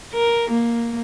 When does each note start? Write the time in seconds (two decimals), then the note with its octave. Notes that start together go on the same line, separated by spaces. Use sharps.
0.13 A#4
0.51 A#3